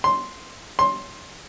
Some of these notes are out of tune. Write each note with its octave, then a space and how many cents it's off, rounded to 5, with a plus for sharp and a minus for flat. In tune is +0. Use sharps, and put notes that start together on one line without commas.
C6 +0
C6 +15